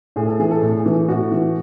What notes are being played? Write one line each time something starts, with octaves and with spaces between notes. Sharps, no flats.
A2 G#4
A4
E3 G#4
A4
A2
G#4
E3
A2 F#4
E3